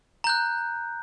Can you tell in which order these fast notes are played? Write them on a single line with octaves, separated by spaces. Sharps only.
A#5 G6 F#6